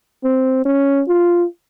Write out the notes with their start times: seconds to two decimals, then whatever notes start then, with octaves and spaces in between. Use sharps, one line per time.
0.24 C4
0.65 C#4
1.08 F4